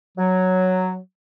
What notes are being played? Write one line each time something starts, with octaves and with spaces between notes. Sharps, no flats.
F#3